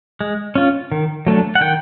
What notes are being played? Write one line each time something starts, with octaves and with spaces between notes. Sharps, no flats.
G#3
C#4 F4
D#3
F#3 A3 D4
F#5
D#3 G5